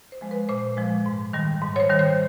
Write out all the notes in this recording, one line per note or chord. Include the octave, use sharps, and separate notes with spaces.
C5
F3 G#3
B4
A#2 C5
F3 G#3
G#2
D#3 G3
G#2
C#5
C5
D#3 G3
C5